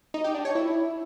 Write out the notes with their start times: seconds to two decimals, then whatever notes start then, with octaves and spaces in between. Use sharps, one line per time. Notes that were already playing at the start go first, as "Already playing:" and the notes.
0.14 D#4
0.24 G4
0.35 D4
0.45 C#5
0.55 E4